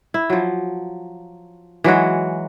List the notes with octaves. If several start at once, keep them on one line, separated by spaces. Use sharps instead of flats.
E4
F3 F#3
E3 F#3 G#3 F#4